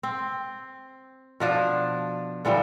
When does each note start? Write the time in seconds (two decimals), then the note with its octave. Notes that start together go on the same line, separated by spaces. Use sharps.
0.03 C4
1.40 B2 F3 D4
2.45 D3 E3 F3 G3